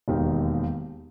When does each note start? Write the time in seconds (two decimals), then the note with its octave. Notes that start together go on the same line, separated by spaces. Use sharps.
0.08 E1 D#2 D#3